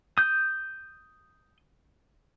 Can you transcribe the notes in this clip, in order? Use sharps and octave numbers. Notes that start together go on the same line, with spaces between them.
D#6 G6